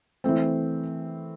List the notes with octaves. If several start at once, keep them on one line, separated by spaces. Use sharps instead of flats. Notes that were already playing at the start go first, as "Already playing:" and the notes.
E3 A3 C4